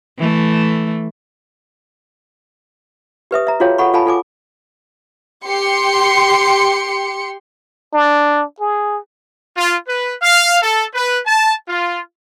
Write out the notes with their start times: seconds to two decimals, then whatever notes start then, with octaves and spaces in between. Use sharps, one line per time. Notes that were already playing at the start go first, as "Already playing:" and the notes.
0.18 E3 A3
3.31 G4 B4 E5 D#6
3.47 E5 A#5
3.60 F4 F#4 G#4 C#5 F5 G5
3.78 A4 F#5 B5 C#6
3.93 F4 A4 F5 G#5 A5 B5
4.06 F4 A4 G#5 D6
5.45 G4 C6 C#7
7.94 D4
8.60 G#4
9.57 F4
9.87 B4
10.22 F5
10.62 A4
10.94 B4
11.26 A5
11.68 F4